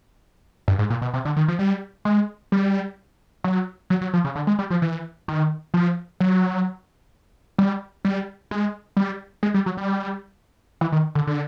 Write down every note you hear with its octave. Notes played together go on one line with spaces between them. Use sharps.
G2
G#2
A#2
B2
C3
D3
D#3
F3
G3
G#3
G3
F#3
F#3
F#3
F3
C#3
D3
G#3
G3
F3
E3
D#3
F3
F#3
G3
G3
G#3
G3
G#3
G3
F#3
G3
E3
D#3
D3
D3